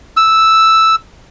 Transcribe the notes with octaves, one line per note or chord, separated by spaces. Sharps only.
E6